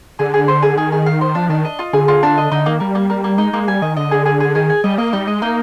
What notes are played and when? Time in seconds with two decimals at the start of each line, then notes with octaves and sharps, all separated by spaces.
0.19 D3 G#4
0.34 G#4
0.48 C5
0.63 G#4
0.77 D#3 G#4
0.92 G#4
1.06 F5
1.21 C5
1.35 F3 D4
1.49 D#3 D4
1.65 D#5
1.79 F4
1.93 D3 G#4
2.08 F4
2.23 D4
2.38 D#5
2.52 D3 D#4
2.66 D#3 A#3
2.80 G3 A#3
2.95 A#3
3.10 A#3
3.24 A#3
3.38 G#3 D#4
3.53 G#3 A#3
3.68 G3 G#5
3.82 D#3 D#5
3.97 D3 D#5
4.11 G#4
4.26 G#4
4.40 G#4
4.55 D#3 G#4
4.69 G#5
4.84 G3 D#5
4.98 A#3 D#5
5.13 G3 D#4
5.27 G#3 D#5
5.42 A#3 D#4